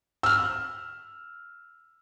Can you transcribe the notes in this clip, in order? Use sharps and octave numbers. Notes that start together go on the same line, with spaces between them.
E6 F6